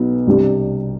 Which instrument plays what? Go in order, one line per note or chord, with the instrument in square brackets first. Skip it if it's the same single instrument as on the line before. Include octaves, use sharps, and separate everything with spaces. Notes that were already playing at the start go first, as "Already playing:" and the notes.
Already playing: [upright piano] B1 B2 B3 D#4
C2 C3 G3 D4 G4